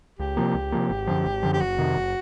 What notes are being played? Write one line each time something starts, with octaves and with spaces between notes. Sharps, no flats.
C#2 G4
C3 F3 A#3
C#2
C3 F3 A#3
G#1
F#2 D3 F3
G#1
F#2 D3 F3
G4
F#1 F#4
F2 C3 D#3
F#1